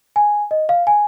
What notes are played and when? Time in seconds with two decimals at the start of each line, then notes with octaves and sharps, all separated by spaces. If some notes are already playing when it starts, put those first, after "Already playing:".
0.16 G#5
0.51 D#5
0.69 F5
0.87 G#5